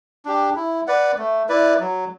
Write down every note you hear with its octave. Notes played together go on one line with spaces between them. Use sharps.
D4 G4
E4
B4 D5 F#5
A3
E4 B4 D5
F#3